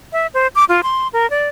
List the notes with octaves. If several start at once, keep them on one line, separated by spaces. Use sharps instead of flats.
E5
C5
D6
F4
C6
A#4
D5